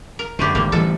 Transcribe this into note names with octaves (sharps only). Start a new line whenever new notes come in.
A#4
F#2 D3 A3 B3 G4
G#1 D3 G3 A#3
A1 E3 G3 A4